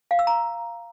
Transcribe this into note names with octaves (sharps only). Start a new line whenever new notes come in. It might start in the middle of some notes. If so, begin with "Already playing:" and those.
F5
E6
A#5